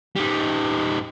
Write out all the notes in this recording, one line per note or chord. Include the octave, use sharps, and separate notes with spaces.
G3 D#4